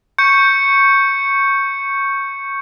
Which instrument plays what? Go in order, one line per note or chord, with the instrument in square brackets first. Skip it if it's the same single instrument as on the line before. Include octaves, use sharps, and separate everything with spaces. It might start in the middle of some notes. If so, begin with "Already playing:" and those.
[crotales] C#6 G6 C#7